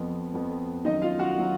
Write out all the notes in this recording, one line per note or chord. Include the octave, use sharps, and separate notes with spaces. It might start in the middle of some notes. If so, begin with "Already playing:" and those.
Already playing: F2 F3 B3
F2 F3 B3
F#2 D#3 F#3 D#4 D#5
F4 F5
F#4 F#5
D#3 F#3